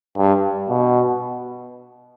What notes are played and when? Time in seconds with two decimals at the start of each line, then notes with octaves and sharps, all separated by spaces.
0.17 G2
0.69 B2